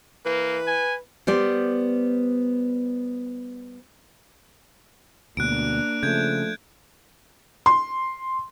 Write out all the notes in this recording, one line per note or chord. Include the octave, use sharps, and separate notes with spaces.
E3 A#3 B4
G#5
G3 B3 C5 D5
D2 B2 A#3 D4 F#6 D7
C#3 F3 A3 G6 G#6
C6